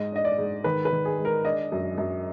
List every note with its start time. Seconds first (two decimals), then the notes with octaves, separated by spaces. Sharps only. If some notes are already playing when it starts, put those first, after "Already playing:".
Already playing: G#2 D#5
0.12 D4 D#5
0.25 D5
0.38 G#2
0.64 D#3 B4
0.85 B4
0.92 D#3
1.05 G#4
1.19 G#3
1.25 A#4
1.45 D4 D#5
1.72 F#2
1.98 F#2